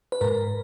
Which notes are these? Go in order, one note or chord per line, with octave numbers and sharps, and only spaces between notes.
B4
G#2 A#4